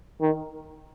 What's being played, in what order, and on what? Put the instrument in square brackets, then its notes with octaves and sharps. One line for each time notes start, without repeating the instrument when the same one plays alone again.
[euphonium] D#3